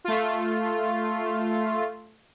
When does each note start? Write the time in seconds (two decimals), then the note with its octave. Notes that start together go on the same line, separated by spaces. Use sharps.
0.04 A3 F4